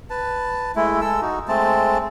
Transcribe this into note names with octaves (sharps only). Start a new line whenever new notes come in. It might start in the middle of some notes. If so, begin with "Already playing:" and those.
B4 A5
G#3 A3 E4
G#3 A4 E6
D#4 F#4
G#3 A3 C4 A5